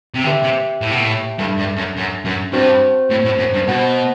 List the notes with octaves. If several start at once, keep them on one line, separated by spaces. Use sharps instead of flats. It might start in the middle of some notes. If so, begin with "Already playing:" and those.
C3
D3 G4 B4 E5 G5
C3
A2
B2
A2
G2 D4 A4 E5 A5
G2
F#2
F#2
F#2
G2 C4 F#4 C5
A2
A2
F#2
G2
B2 F#4 C5 F#5 A5